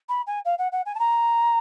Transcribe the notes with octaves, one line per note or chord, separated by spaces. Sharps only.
B5
G#5
F5
F#5
F#5
G#5
A5
A#5